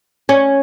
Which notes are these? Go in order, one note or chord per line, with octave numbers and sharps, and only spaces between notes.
C#4